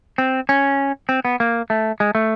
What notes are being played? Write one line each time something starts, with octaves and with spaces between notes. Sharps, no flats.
C4
C#4
C4
B3
A#3
A3
G#3
A3